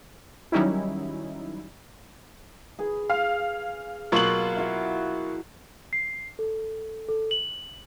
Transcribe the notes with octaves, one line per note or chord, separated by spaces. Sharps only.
D#3 F#3 G3 C#4 D#4 E4
G#4 B4
F5
B2 F#3 A#3 F4 F#7
E4 F#4 E5
C7
A4
A4
F#7